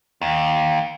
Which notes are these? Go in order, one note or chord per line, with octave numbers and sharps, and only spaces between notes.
D#2